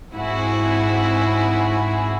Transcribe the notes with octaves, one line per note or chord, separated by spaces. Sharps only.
G#2 C4 E4 F#4 G#4